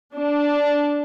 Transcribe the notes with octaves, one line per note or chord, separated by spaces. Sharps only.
D4